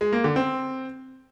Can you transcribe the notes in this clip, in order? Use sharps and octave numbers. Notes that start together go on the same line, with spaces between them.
G#3
A#3
D3
C4